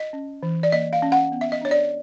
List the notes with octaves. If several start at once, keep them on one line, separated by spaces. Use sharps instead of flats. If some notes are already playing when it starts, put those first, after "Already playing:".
Already playing: D#5
C#4
E3
D5
A#3 D#5
F5
C#4
F#5
B3
E5
D#5
D4 C#5
D5